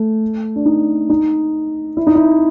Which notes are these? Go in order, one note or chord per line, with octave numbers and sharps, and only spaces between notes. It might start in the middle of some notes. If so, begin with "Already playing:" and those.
Already playing: A3
D4
D#4
D#4
E4
D#4
E4